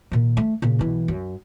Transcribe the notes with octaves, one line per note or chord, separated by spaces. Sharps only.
A#2 D#3
A3
A#2 C#3
B1 E3
F#2